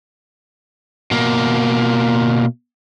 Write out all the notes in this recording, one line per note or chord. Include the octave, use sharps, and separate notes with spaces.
B2 A#3